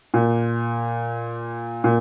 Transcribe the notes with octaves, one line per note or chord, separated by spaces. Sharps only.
A#2
A#2